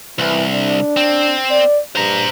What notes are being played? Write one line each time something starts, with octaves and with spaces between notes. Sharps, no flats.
C2 E3
D4
C4
D5
G2 C5 A#5